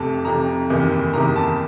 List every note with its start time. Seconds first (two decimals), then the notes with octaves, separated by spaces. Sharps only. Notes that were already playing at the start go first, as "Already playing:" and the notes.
Already playing: F1 F2 C3 A5
0.25 F1 F2 C3 A#5
0.69 F#1 E2 C3 D#3
1.13 F#1 E2 C3 D#3 A#5
1.36 A5